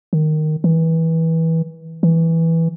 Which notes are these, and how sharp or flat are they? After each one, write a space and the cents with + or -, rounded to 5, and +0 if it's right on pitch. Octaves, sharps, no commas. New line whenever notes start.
D#3 -10
E3 -20
E3 -5